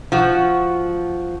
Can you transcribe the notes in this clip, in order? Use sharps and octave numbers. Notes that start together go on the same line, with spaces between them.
F3 F#4